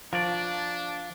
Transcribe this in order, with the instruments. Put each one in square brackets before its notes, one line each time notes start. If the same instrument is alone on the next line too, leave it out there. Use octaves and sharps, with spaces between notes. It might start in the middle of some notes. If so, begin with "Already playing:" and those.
[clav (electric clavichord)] F3 [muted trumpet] D4 [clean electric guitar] A#4 C#5 D5